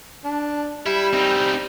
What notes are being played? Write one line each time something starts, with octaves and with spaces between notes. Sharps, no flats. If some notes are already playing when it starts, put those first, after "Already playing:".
D4
G3 E4
C4 D#4